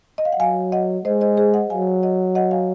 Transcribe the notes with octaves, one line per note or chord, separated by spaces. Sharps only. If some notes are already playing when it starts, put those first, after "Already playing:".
D#5
F5
F#5
F#3 F5 G#5
D#5 F#5
G#3 C5 D#5
C5 D#5
G#4 C5
D#5 F#5
F#3 F5 G#5
D#5 F#5
D#5 F#5
F5 G#5